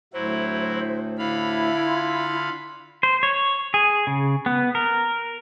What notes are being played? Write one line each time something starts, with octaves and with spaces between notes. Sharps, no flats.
D2 A2 F#3 E4 C5
D3 E4 F5 B5
F4
C5
C#5
G#4
C#3
B3
A#4